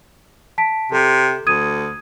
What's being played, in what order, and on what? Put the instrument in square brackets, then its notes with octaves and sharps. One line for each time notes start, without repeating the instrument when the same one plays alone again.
[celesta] A5 B6 D7
[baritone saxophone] C3 [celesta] A4
[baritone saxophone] D2 [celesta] D#6 G#6 D#7